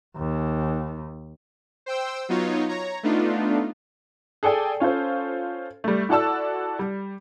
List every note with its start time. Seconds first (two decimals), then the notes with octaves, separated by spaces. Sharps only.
0.16 D#2
1.86 C5 G5 E6
2.29 F#3 B3 D#4 F4 C#5
2.69 C#5 A#5
3.03 A3 B3 D4 D#4 F4
4.43 G#4 A4 D5 G5 G#5
4.80 C#4 F4 A4 C5
5.84 G3 A3
6.09 E4 F#4 A4 D5 A5 E6
6.79 G3